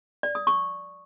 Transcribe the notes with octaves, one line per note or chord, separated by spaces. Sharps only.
D5
D#6
C#6